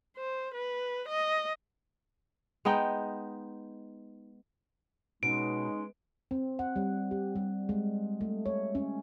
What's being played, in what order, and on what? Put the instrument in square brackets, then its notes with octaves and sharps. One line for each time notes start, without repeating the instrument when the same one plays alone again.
[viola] C5
B4
D#5
[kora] G#3 B3 D#4 G5
[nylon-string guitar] B2 [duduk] G#3 [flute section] C#4 D#4 [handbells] D7
[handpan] C4
F#5
G3
G4
G3
G#3
A3
C#5
C#4